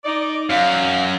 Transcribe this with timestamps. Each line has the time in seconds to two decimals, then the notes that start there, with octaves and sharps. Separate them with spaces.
0.05 D#4 D5
0.50 F#2 F5